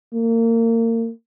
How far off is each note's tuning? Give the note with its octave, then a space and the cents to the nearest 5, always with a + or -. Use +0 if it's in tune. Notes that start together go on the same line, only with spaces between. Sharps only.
A#3 -30